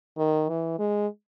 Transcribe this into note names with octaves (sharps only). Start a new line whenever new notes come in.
D#3
E3
G#3